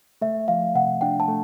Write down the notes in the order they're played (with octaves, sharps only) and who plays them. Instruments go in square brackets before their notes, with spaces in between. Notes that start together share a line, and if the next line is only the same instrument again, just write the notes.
[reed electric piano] A3 [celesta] E5
[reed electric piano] F3 [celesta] F5
[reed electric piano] C3 [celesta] F#5
[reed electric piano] D4 [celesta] G5
[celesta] A5
[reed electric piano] A3